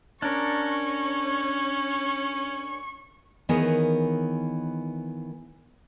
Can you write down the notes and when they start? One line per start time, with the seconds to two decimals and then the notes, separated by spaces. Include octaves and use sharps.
0.22 C#4 D4 A#4 C#6
3.49 D#3 E3 B3 G#4 A#4 C#5